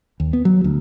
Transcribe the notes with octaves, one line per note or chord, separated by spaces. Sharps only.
D#2
B3
F#3
D2